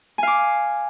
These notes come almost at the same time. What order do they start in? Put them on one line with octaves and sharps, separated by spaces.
G#5 F5 D6